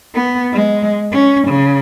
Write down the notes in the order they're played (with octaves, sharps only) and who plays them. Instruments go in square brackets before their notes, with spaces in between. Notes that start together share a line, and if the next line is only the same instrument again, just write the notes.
[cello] B3
G#3
C#4
C#3